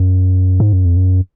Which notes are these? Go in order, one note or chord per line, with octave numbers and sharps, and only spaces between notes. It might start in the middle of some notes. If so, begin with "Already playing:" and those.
Already playing: F#2
G#2
F#2
F2
F#2